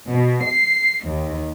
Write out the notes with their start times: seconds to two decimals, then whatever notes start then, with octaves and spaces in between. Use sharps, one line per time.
0.11 B2
0.48 C7
1.05 D#2